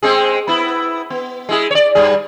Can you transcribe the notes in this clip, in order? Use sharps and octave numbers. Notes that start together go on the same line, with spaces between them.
G#3 C4 G#4
B3 E4
B3
G#3 E4 G#4
C#5 D5
G2 G3 G#4